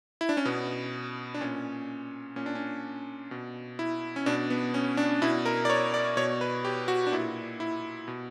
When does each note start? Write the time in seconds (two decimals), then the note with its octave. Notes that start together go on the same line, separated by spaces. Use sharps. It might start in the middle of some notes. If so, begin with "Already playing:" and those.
0.21 E4
0.29 D4
0.37 C#4
0.45 B2 B3
1.34 D4
1.41 A#2 C#4
2.36 A#2 C#4
2.46 D4
2.55 C#4
3.31 B2
3.79 E4
4.16 C#4
4.26 B2 D4
4.50 B3
4.74 C#4
4.97 D4
5.22 B2 E4
5.46 A#4
5.65 D5
5.70 C#5
5.94 D5
6.17 B2 C#5
6.41 B4
6.65 G4
6.88 F#4
7.06 D4
7.12 A#2 E4
7.60 E4
8.08 B2